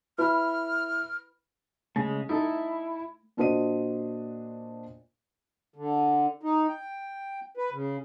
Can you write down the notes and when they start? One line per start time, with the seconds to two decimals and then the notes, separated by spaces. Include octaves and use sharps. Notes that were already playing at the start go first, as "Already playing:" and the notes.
0.18 E4 B4 B5 F6
1.96 C#3 G#3 A3
2.29 D#4 E4 A4
3.37 A#2 D4 F#4 C5 D#5 D#7
5.76 D3
6.43 D#4
6.68 G5
7.57 B4
7.72 C#3